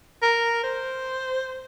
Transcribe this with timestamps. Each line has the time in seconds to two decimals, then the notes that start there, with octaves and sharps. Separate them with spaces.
0.22 A#4
0.64 C5